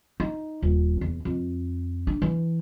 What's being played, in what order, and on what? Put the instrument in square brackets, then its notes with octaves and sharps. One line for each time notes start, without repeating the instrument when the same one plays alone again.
[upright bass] D#4
D#1
E2
F2
D4
E3